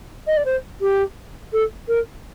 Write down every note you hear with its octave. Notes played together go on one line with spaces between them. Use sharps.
D#5
D5
C5
G4
A4
A#4